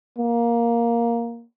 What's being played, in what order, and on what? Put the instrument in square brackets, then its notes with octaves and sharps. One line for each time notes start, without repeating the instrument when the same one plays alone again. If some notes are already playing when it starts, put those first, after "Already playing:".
[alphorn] A#3